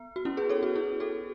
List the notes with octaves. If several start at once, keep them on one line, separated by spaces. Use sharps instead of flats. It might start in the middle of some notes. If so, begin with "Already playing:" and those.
Already playing: B3
F#4
C#4 E4
G#4 B4
A4 C#5
F#4 A4
E4 G#4
F#4 A4